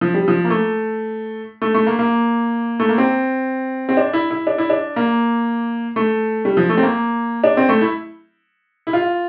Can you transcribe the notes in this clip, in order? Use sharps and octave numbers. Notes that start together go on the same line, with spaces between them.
F3
G3
F3
A#3
A3
A3
A3
A#3
A#3
A3
A#3
C4
C4
D4
E4
E4
D4
E4
D4
A#3
A3
G3
F3
A3
C4
A#3
D4
C4
A3
E4
E4
F4